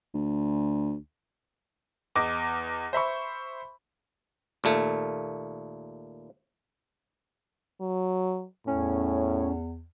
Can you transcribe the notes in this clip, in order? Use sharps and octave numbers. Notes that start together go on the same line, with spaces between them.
D2
E2 D#5 D6
C5 E5 B5 C#6
D#2 A#2 A3
F#3
E2 A2 C#4